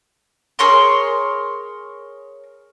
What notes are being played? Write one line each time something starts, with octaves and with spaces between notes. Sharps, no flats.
G#4 A#4 C#5 C6